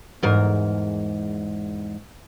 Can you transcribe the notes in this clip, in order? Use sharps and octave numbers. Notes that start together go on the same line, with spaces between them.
E2 G#2 A#4